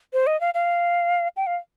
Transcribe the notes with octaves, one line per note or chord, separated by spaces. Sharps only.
C5
D#5
F5
F5
G5
F5